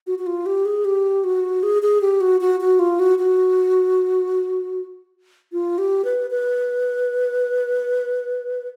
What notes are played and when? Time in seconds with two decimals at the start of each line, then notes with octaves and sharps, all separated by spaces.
0.07 F#4
0.19 F#4
0.26 F4
0.46 G4
0.65 G#4
0.85 G4
1.24 F#4
1.63 G#4
1.82 G#4
2.01 G4
2.21 F#4
2.41 F#4
2.60 F#4
2.79 F4
3.00 F#4
3.18 F#4
5.53 F4
5.78 G4
6.05 B4
6.30 B4